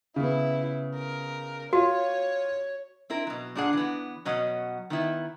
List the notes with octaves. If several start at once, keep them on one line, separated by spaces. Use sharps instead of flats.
C#3 B3 E4
A#4
F4 F#4 C#5
C4 E4 A#4
B2 F#3
A#2 D4 G#4 F#5
E3 B3
B2 F#3 C#4 D#5 F#5
D#3 B3 E4